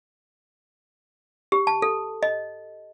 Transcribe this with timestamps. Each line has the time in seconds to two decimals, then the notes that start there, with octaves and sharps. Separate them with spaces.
1.52 G4
1.67 A5
1.82 A4
2.23 D#5